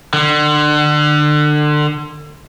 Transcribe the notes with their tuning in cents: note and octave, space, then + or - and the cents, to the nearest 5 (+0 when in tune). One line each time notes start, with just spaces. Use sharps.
D3 +30